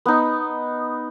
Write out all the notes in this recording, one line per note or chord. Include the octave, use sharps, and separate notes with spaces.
B3 D#4